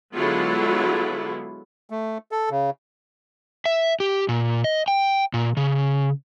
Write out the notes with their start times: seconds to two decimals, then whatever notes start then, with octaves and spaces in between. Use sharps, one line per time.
0.15 D3 F#3 G#3 B3 E4 F4
1.90 A3
2.32 A4
2.50 C#3
3.66 E5
4.00 G4
4.29 A#2
4.64 D#5
4.88 G5
5.34 A#2
5.57 C#3